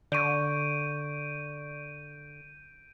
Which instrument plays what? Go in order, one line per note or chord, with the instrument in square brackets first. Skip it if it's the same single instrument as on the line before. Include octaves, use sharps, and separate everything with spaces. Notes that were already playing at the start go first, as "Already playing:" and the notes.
[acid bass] D3 [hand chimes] D5 C#6 [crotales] G6 D7 D#7